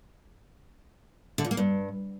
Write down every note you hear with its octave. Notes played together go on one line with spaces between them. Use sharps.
D3
A#2
A#3
G2